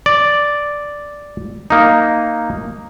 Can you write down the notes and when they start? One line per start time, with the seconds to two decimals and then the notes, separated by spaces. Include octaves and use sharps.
0.06 D5
1.70 A#3 D#4